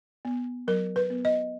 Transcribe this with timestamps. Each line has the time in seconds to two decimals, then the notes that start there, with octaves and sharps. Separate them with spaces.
0.25 B3
0.68 F#3 A#4
0.96 B4
1.10 B3
1.25 D#5